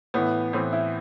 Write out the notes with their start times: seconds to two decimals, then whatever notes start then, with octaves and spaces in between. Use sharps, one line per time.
0.14 A2 E3 B3
0.53 A2 E3 C4
0.73 E4